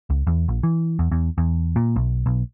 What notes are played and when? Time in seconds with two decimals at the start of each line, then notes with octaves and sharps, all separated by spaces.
0.10 C#2
0.27 E2
0.48 A#1
0.63 E3
0.99 E2
1.12 E2
1.38 E2
1.76 A#2
1.96 B1
2.26 B1